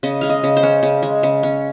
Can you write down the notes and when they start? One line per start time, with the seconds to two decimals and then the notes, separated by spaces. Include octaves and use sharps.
0.03 C#3 D#5
0.21 G#3 F5
0.29 D#5
0.44 C#3
0.57 C5
0.63 C#4
0.83 C#3
1.03 G#3
1.23 C#3
1.43 C#4